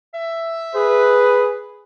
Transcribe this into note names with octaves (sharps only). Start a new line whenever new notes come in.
E5
G#4 B4